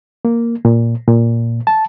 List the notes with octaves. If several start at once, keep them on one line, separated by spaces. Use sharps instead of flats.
A#3
A#2
A#2
A5